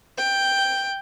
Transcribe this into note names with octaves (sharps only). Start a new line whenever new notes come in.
G5